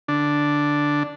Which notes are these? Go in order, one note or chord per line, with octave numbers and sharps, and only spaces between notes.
D3 D4